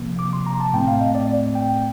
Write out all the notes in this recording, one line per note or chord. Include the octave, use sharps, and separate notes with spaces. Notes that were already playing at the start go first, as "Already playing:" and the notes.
Already playing: C3 F3 A#3
D6
C6
A#5
A5
A2 A3 C4 G5
F5
D#5
D5
G5